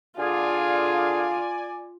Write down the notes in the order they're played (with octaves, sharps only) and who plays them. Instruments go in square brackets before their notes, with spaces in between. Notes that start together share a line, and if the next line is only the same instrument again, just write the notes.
[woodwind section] D3 G#4 F5 [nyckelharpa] F4 [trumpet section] D5 G#5